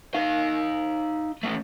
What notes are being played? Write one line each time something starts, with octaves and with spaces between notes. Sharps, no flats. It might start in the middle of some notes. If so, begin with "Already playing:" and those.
D#4 F5
A3 C#4